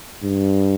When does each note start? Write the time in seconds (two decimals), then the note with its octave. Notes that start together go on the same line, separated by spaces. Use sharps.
0.23 G2